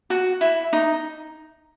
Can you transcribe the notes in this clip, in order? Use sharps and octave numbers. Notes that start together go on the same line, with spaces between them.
F#4
E4
D#4